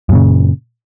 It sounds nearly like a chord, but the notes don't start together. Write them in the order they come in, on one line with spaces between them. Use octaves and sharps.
F#2 A#2 C#3